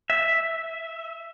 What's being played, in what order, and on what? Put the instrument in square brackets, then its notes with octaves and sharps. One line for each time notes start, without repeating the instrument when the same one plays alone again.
[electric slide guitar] E5